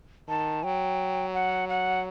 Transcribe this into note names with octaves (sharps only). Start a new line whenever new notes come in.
D#3 A5
F#3 G5
F#5
F#5